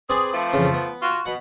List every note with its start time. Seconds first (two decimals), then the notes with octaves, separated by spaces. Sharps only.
0.10 C4 G#4 B4 D5
0.33 F3 A3
0.53 F2 C#3 E3
0.74 B3
1.00 F4 F#4
1.26 B2 F#5